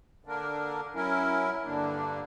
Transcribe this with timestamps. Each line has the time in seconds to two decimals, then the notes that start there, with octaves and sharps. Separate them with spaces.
0.25 D3 A#3 D4 A#4
0.95 F#3 C#4 E4 A#4
1.64 G2 D3 A#3 D4